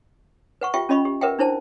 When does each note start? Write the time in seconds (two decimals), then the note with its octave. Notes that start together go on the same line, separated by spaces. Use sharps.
0.61 B4 F#5 C#6
0.74 F4 G4 E5 G5 C#6
0.89 C#4 F4 D#5 B5 C#6
1.05 G4
1.21 A#4 B4 E5 F#5 G5
1.39 D4 E4 C5 A5